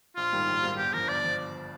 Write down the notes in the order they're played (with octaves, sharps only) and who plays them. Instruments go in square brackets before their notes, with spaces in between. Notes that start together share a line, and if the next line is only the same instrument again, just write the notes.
[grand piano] A#1 [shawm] F4
[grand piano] G#2 D#3 G3 A#3
A#1
G#2 D#3 G3 A#3
[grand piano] G1 [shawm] G4
[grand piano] G2 F3 [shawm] A#4
[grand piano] G1 [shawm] D5
[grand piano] F3